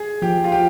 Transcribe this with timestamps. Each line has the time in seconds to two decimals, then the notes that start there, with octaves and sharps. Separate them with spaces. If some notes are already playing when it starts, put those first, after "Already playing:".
Already playing: G#4
0.22 F3 G4
0.44 F4
0.52 G4